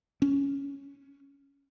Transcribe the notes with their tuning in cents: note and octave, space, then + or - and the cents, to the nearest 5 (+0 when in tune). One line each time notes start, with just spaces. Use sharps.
C#4 +5